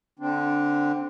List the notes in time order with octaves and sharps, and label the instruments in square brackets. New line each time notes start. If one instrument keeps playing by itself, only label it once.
[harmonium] D3 C4 D4